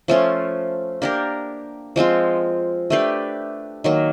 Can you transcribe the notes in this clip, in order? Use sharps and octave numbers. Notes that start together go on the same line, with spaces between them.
F3 A3 C#4 F4
A#3 D4 G4 A#4
F3 G#3 C4 F4
A3 D4 G4 B4
D#3 F#3 A#3